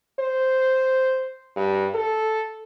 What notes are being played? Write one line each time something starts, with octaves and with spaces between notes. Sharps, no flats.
C5
G2
A4